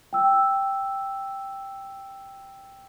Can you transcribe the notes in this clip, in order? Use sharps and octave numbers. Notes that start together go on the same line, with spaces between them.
G5 E6